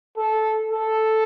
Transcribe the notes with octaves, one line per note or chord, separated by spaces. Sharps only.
A4
A4